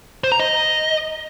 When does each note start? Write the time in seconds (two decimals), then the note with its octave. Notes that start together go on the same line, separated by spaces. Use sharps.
0.24 C5
0.32 A#5
0.40 D#5